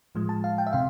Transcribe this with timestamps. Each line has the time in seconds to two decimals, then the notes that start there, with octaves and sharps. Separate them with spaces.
0.15 A2 F3 G#3
0.29 A5
0.44 F5
0.58 G5
0.67 E5
0.73 C3 F5